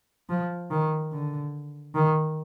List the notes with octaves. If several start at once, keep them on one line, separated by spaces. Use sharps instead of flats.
F3
D#3
D3
D#3